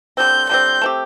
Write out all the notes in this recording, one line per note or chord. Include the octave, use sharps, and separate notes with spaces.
D3 G3 C4 G6
D3 G3 C4 G6
A3 C4 G4